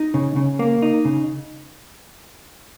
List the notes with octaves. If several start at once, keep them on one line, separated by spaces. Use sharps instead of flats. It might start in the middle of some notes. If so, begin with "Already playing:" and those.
Already playing: D#4
C#3
C#3
A#3
D#4
C#3